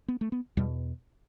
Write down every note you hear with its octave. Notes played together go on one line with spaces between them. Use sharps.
B3
A3
B3
E2 B2 G3